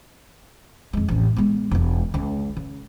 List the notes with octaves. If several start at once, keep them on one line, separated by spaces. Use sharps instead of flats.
F2 G#3
A1 F2
G#3 B3
E1 F4
C#2
C#3